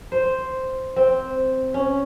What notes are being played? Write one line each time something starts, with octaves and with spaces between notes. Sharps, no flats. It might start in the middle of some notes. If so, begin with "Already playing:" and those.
C5
C4
C#4